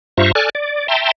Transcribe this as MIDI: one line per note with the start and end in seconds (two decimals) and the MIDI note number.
0.18 0.32 43
0.18 0.32 65
0.18 0.32 72
0.18 0.32 76
0.18 0.32 82
0.18 0.32 85
0.35 0.49 69
0.35 0.49 74
0.35 0.49 80
0.35 0.49 89
0.35 0.49 90
0.55 0.87 74
0.88 1.11 76
0.88 1.11 79
0.88 1.11 81
0.88 1.11 82
0.88 1.11 84